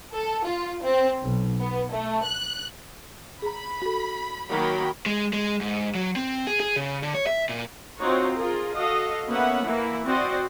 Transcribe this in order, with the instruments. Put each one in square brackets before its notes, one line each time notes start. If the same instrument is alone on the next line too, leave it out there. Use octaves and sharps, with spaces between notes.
[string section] A4
F4
C4
B1
B3
A3
F#6
[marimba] G#4 A#5 [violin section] B5
[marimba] F#4 A4
[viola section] D#3 F#3 A#3 [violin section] A#4 G5 B5
[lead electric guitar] G#3
G#3
G#2
F#3
C4
G#4
G#4
C#3
D3
C#5
E5
A#2
[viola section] C4 D#4 F4 F#4 C#5
F4 G#4 A#4
F#4 A4 D#5 F5
A#3 B3 C#4 B4 E5 F#5
E3 A#3 E4
C4 F#4 C5 D5 D#5